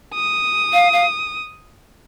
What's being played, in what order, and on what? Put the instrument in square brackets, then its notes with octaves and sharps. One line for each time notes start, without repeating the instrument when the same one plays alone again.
[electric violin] D#6
[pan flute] F5
F5